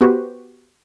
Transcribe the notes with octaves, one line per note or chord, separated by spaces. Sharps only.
B3 F#4 G4 B4 C5